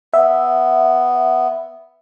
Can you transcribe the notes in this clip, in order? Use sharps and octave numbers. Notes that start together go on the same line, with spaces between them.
B3 E5